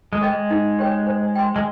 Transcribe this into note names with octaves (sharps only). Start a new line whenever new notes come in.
G#3
G#4 D#5 G5
G#3
D#4
G4 C#5 G5
C5
G5 C6
G#3